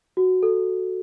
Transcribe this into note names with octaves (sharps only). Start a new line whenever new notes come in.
F#4
A4